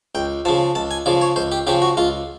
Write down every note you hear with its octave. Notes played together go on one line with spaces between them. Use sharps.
C#2 G5
C#3 F3 A5
C#2 A5
G#5
C#3 F3 D5
C#5
C#2 C5
G4
C#3 F3 G4
F#4
C#2 F4